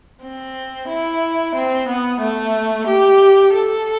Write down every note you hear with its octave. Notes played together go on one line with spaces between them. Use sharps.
C4
E4
C4
B3
A3
G4
A4